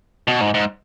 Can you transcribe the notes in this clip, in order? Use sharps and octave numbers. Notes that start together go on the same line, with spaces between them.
B2
G#2
G#2